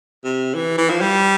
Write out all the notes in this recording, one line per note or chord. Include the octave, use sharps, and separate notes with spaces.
C3
E3
E3
F3
G3